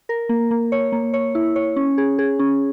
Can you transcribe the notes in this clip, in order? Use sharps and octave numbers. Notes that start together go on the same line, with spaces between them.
A#4
A#3
A#3
C#5
A#3
C#5
E4
C#5
C#4
G#4
G#4
C#4